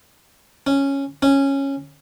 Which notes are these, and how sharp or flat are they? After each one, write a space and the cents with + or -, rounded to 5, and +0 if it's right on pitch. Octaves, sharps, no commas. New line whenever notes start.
C#4 -5
C#4 -10